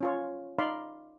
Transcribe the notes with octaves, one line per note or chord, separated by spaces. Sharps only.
C#4 F4 C#5
D#4 D5 F5 B5 C6